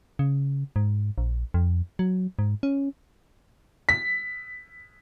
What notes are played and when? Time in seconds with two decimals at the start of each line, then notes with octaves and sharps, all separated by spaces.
0.19 C#3
0.76 G#2
1.18 A#1
1.54 F2
1.99 F#3
2.39 G#2
2.63 C#4
3.89 B6